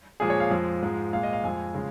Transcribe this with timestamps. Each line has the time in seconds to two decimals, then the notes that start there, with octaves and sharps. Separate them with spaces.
0.20 A#2 F3 G#3 G#4
0.30 C#5
0.40 F5
0.50 F2 F3 G#3
0.82 G#2 F3 G#3
1.13 A#2 G#3 F5
1.23 D#5
1.33 F5
1.44 F2 F3 G#3 G#5
1.74 C#3 F3 G#3